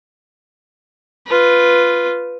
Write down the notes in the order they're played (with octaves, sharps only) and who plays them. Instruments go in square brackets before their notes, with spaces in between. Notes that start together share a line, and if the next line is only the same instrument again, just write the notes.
[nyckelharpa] F4 B4